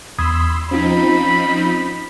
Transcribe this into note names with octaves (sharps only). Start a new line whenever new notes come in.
E2 B5 C6 D#6 E6 G#6
F3 C4 C#4 D#4 F4 B5